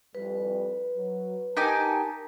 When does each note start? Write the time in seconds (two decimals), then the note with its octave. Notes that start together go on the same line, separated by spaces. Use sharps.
0.15 C2 F2 G3 B4
0.97 F#3
1.57 D#4 G4 A#4 G#5 A5